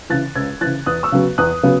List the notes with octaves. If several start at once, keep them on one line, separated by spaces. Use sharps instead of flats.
C#3 E3 F#6 A6
C#2 E6 G#6
C#3 E3 F#6 A6
E2 D#6 F#6
C#6 E6
C#3 F#3 B3
E2 D#6 F#6
C#3 F#3 B3